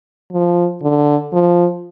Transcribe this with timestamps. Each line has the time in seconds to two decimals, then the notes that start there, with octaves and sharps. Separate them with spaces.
0.32 F3
0.82 D3
1.32 F3